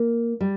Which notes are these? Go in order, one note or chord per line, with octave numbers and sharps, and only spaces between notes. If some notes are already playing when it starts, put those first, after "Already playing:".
Already playing: A#3
G3